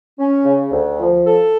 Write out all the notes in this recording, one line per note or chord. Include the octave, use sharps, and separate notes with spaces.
C#4
C#3
D2
F3
A4